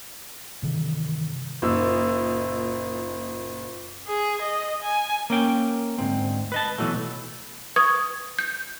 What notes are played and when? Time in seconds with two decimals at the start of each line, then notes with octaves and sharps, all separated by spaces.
0.62 G2 C3 D#3 E3
1.62 F#1 A#2 D#4 E6
4.08 G#4
4.42 D#5
4.83 G#5
5.30 A#3 C#4 G5
5.98 D2 G#2 C4
6.52 B4 D#5 A5
6.78 B2 E3 F#3 A3
7.76 B4 C#6 D#6 G#6
8.39 G6